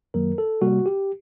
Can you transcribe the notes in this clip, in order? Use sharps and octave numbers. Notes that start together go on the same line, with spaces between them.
F#2 D#3 F#3 A#3 A#4
A4
C3 G3 A#3 F#4
G4